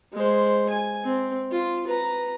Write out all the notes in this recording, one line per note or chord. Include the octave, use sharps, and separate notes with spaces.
G#3 C5
G#5
C4
F4
B4 A#5